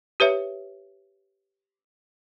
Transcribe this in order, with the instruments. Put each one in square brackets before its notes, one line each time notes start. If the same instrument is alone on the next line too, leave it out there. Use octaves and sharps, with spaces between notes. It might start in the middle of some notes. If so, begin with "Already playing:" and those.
[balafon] G4 B4 C#5 E5